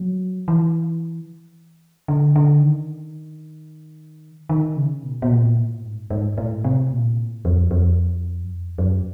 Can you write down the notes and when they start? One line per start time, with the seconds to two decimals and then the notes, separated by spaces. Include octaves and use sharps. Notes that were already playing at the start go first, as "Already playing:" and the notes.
Already playing: F#3
0.48 E3
2.08 D3
2.36 D3
2.62 D#3
4.49 D#3
4.77 C#3
5.03 B2
5.22 B2
5.30 A#2
5.57 A2
5.83 G#2
6.10 G#2
6.38 A2
6.64 C3
6.91 A#2
7.18 A2
7.45 F2
7.71 F2
8.43 F#2
8.51 F2
8.78 F#2